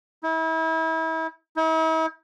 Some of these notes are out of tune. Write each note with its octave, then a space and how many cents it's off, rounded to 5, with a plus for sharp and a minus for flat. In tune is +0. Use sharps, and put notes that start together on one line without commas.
E4 -35
E4 -45